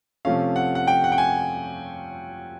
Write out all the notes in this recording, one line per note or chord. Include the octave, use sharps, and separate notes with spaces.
C3 F3 A3 C#4 F5
F#5
F#5
G5
F#5
G5
G#5